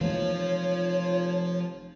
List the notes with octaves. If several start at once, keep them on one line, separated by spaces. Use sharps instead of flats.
F1 E3 F3 G#3 A#3 C#5 F5